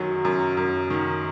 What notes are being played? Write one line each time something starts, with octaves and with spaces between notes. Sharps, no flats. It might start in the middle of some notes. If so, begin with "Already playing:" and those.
Already playing: F#2 D#3 F#3
F#2
F#2
D#3